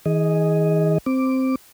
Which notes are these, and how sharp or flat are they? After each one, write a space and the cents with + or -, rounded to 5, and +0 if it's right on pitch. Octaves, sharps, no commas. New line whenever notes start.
E3 -45 G#4 +0 D#5 +0
C4 +0 D6 +0